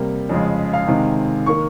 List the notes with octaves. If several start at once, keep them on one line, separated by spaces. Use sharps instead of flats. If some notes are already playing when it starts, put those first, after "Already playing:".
Already playing: C3 G3 A#3
F2 C#3 G#3
F5
C3 D#3 G#3
D#3 A#3 C#6